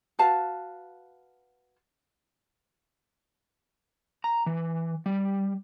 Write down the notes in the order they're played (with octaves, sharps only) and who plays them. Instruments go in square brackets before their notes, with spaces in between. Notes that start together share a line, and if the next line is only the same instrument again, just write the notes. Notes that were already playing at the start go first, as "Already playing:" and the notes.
[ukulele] F#4 B4 F5 A5
[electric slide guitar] A#5
E3
G3